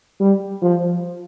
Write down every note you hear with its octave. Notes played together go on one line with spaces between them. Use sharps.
G3
F3